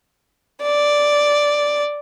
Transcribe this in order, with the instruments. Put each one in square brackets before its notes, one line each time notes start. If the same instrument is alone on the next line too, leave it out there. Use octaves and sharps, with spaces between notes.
[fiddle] D5